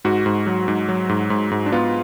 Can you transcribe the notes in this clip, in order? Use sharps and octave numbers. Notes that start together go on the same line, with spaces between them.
G#2 F#4
G#2
F#3
G#2
F#3
G#2
G#2
G#2
D4
B3 F4